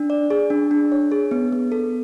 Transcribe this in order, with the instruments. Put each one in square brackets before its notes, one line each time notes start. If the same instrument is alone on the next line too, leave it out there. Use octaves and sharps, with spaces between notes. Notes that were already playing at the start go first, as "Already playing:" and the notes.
Already playing: [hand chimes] D4
D5
G#4
D4
D4
C#5
G#4
B3
B3
A4